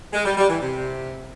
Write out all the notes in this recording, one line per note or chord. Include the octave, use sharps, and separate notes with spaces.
G#3
G3
G3
E3
C3